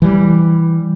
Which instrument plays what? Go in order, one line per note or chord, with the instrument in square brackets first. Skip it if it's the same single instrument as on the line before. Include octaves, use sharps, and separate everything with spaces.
[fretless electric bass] E3 G3